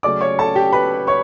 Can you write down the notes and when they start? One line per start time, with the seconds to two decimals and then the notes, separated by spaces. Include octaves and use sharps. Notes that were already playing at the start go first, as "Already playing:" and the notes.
0.03 C#3 F#3 A3 C#4 D5 D6
0.21 C#5 C#6
0.38 A4 A5
0.56 G4 G5
0.73 B4 B5
1.07 C#5 C#6